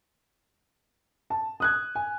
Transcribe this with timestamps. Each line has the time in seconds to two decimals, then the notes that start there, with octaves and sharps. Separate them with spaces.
1.30 A5
1.60 D#6 F#6 G#6
1.95 G#5